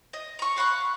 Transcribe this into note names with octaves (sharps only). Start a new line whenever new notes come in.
D#5
A#5 C#6
F5 F#5 B5 C#6